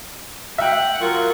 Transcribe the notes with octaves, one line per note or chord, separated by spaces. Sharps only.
E5 F#5 G5
F#3 F4 A#4 C#6